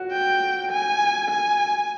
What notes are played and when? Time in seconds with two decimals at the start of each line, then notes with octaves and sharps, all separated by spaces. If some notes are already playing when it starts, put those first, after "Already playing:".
Already playing: F#4
0.12 G5
0.71 G#5
1.30 G#5